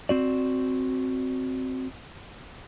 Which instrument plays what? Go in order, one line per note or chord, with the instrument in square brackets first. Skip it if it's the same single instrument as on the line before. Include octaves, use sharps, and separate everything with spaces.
[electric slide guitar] C4 F#4 D5